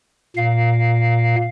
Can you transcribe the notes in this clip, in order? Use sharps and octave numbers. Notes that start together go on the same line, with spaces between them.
A#2 F5